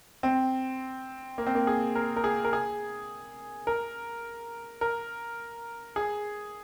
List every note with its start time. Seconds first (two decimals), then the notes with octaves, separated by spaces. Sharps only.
0.23 C4
1.38 A#3
1.46 C4
1.55 A#3
1.67 G#4
1.95 A#4
2.16 A#4
2.24 G#4
2.45 A#4
2.53 G#4
3.67 A#4
4.81 A#4
5.96 G#4